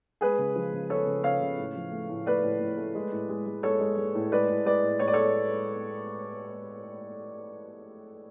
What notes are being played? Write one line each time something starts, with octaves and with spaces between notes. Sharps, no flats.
G#3 G#4 B4
C#3
F3
C#3
G#3 A4 C#5
C#3
C#3 C#5 F5
C#3
A2
F3
A3
A2
A3 B4 D5
A2
A2
A3
G#3
A2
G#3
G#3
G#3 A4 C#5
G#3
G#3
A2
G#3 B4 D5
A2
G#3 B4 D5
A2
A2 C#5
D5
A4 C#5